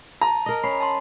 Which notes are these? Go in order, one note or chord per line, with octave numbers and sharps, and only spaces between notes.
A5 A#5
A#4 D#5
C#4 B5 C7
A5 C6